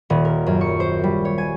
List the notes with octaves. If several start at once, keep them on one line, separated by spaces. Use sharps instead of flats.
D#1
A#4
F#2
C#6
C5
G3
C#5
G#5